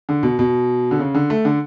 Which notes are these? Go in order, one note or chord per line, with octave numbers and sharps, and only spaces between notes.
D3
B2
B2
D3
C#3
D3
A3
D3